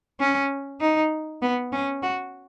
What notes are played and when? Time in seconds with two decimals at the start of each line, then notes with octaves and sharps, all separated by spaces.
0.20 C#4
0.81 D#4
1.42 B3
1.72 C#4
2.03 F#4